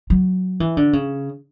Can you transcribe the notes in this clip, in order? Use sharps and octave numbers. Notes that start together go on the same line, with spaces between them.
F#3
E3
D3
C#3